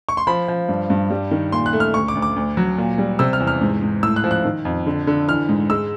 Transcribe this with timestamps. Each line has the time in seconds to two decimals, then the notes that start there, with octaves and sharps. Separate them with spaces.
0.09 C#6
0.17 C6
0.27 F3 B5
0.48 F3
0.69 G2
0.90 G2
1.10 G3
1.31 D#3
1.52 A#2 C6
1.66 F#6
1.73 A3
1.80 F6
1.94 D2 C#6
2.08 D6
2.15 D2
2.22 D6
2.36 D2
2.57 F#3
2.78 A#2
2.98 G3
3.19 C3 E6
3.33 F6
3.40 E2
3.47 F6
3.61 G#2
3.81 G#2
4.03 A2 E6
4.16 F#6
4.24 F3
4.31 F#6
4.45 D#3
4.65 F2
4.87 D3
5.07 D3
5.28 E3 F6
5.49 G#2
5.70 G#3 E6